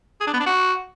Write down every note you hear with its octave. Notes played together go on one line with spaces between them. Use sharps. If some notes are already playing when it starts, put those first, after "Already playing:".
G#4
D4
B3
D4
F#4